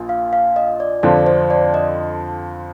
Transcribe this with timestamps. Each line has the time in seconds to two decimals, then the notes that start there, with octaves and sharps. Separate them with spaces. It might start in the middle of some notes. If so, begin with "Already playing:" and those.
Already playing: A#1 A#2
0.09 F5
0.33 F5
0.56 D#5
0.80 D5
1.03 F2 D3 F3 C4 D5
1.26 C5
1.50 D5
1.74 D#5